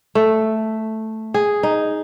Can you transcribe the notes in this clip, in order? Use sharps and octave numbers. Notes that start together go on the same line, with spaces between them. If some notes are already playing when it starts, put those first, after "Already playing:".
A3
G#4
D#4